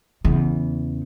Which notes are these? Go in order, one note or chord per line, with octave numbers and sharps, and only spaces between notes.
E2 C#3